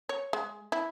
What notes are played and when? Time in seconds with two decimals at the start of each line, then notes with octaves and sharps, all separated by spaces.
0.09 C#5
0.33 G#3
0.72 E4